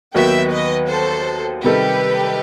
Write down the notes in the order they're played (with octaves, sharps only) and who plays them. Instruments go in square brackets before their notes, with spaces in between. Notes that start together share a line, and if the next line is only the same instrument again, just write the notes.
[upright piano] D#2 D#3 F#3 B3 F#4 [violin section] E5 G5
[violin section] B4 D#5
A4 C5
[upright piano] C3 D#3 G3 D#4 A4 [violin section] G4 B4